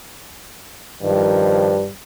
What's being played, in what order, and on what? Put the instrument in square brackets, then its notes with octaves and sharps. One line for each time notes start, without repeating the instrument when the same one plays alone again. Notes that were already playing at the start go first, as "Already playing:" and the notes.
[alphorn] G2 [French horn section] D#3 F3